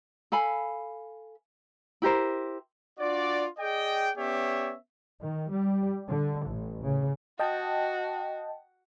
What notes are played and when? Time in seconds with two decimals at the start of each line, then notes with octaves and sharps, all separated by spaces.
0.32 A4 F5 G#5 B5
2.02 E4 G4 A#4 C5
2.99 D4 F4 F#4 D5
3.59 G#4 D5 D#5 G5
4.17 B3 C#4 G4 C#5 D5 E5
5.21 D#3
5.50 G3
6.08 D3
6.46 A1
6.83 C#3
7.39 F#4 D#5 G5 A5